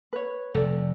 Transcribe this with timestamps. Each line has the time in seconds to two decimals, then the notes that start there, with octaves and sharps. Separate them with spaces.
0.13 B4 C#5
0.54 F1 A4 D5